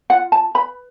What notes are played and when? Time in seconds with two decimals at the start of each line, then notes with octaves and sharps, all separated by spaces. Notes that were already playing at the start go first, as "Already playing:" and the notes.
0.10 F4 F#5
0.32 A5
0.55 B4 B5